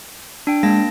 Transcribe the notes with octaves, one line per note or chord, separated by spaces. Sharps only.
D4 G5
G#3 A#3 A5 A#6